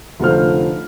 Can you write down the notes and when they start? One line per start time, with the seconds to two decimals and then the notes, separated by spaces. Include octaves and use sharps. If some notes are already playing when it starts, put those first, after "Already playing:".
0.20 F1 D3 A3 F4 C5 F6